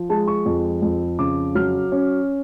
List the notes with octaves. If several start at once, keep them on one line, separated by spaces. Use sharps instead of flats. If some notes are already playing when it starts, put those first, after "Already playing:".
Already playing: F3
G#3 A5
C#6
F2
F2
C#3 D6
F#3 F6
C#4